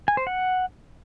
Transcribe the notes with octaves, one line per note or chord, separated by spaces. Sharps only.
G#5
C5
F#5